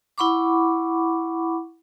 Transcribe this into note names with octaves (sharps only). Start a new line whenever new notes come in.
E4 F#5 B5 C#6 D6